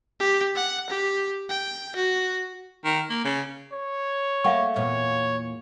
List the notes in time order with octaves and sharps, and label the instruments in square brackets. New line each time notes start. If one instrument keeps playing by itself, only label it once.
[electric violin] G4
F#5
G4
G5
F#4
[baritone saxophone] D#3
A#3
C#3
[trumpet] C#5
[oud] A3 A#3 [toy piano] F5 F#5 C#6
[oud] E2 A#2 B3 [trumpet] C#5